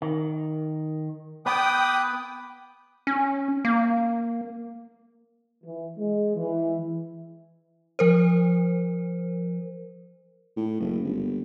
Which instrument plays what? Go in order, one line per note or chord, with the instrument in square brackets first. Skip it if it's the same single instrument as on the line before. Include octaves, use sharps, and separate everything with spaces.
[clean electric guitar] D#3
[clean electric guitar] B3 [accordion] G5 D#6 [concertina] B5 D6 F#6
[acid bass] C#4
A#3
[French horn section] E3
G#3
E3
[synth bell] F3 A#4 C5
[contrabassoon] A2
F#1
G1